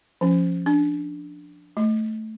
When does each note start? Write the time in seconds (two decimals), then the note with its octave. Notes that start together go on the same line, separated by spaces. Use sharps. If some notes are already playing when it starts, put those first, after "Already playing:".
0.21 F3 C#4
0.66 D4
1.77 A3